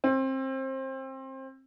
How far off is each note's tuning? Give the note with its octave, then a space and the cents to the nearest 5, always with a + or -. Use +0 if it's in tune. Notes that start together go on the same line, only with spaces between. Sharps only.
C4 +25